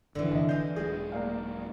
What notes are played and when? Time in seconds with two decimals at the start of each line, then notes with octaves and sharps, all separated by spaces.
0.15 F#1 F2 D3 E3 F#3
0.31 G1 C3 D#5 E5
0.49 E3 D#5 F5 G6
0.76 D#1 F#3 G#3 G#4 D#5
1.12 A#3 D5 F5